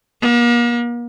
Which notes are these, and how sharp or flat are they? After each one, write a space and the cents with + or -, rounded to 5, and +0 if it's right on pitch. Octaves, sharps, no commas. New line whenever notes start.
A#3 +40